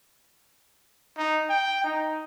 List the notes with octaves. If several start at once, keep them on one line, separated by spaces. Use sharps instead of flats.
D#4
G5
D#4